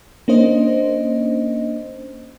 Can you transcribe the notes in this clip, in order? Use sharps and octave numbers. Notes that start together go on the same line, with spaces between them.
A#3 C#4 D4 C5 D#5